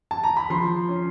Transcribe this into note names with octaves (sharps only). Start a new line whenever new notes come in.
A5
A#5
B5
F3 C6
C#4